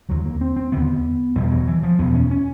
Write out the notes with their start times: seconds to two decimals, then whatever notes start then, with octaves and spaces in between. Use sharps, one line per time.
0.09 D#2 D3 F#3
0.25 A#3
0.41 C4
0.56 C4
0.72 D#2 D3 B3
1.36 E2 B2 G3
1.52 F#3
1.68 E3
1.83 F3
1.99 E2 B2 B3
2.14 C#4
2.31 C#4